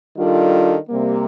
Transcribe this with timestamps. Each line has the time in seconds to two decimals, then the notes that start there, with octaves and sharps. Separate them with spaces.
0.16 D#3 G3 D4 F4 A4
0.90 C3 G3 A#3